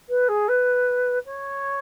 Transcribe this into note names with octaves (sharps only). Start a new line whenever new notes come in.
B4
G#4
B4
C#5